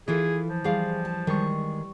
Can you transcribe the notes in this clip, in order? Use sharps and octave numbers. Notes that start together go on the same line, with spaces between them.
E3 E4 F4 G#4 A4
F3
E3 G3 C4 G#4 F5
A5
D#3 G3 G#3 C#6